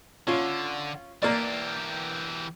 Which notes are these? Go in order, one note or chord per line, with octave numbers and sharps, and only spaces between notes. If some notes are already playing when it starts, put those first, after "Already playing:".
D3 C#4 F4
E3 A#3 G4 D5